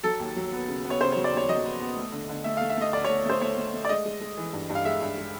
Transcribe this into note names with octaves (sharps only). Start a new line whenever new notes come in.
F#3 A4
D#2
F#3
B3
C#3
B3
C#5
C#3 C5
F#3 C#5
D5
D#2 C#5
F#3 D#5
B3
B3
A3
D3
D3
A3 E5
A3 F5
E5
A3 D#5
D2 D5
A3 C#5
A3 C5
A3 C#5
A3
A3
D5
G#3 D#5
G#3
G#3
E3
G2
G2
F5
G#3 E5
G2
G#3